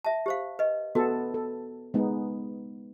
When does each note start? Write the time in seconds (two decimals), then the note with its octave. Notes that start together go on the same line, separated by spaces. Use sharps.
0.05 E5 A5
0.26 G4 C5 F5
0.59 B4 D#5
0.95 B3 F#4 A4
1.34 A4
1.94 G#3 B3 D#4